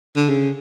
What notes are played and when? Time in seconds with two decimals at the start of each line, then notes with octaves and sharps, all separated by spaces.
0.16 D3
0.29 C#3